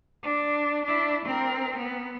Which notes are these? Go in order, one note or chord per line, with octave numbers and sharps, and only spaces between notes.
D4
D4 E4
C4 A#4
B3